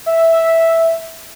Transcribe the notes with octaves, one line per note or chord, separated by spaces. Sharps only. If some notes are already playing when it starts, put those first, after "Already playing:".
E5